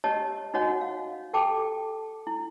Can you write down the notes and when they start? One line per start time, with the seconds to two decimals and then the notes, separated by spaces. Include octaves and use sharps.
0.04 G4 C#5 D#5 A5
0.54 D#4 F#4 C#5 D#5 F#5
0.81 F5
1.33 G4 A4 G5 A5 D6
2.27 E4